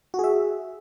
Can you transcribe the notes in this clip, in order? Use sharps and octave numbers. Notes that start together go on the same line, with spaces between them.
F#4 G#4 E5